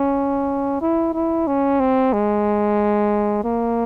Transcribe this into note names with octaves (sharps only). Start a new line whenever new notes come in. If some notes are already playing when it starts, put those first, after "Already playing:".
Already playing: C#4
E4
E4
C#4
C4
G#3
A#3